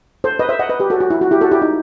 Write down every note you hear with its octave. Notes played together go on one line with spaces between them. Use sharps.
A4 C5
B4 D#5
C5 E5
D#5 F#5
B4 D#5
G4 B4
F#4 A4
F#4
E4
F#4
E4 G4
F#4 A4
E4 G4
D#4